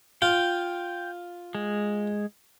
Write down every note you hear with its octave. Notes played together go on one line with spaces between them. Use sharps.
F4 G5
G#3